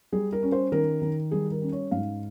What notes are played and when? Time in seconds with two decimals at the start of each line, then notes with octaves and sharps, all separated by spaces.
0.12 G3 G#4
0.33 A#4
0.43 C#4
0.52 C5
0.72 D#3 A#4
1.02 D#3
1.31 G3 G#4
1.52 A#4
1.62 C#4
1.72 C#5
1.91 G#2 F5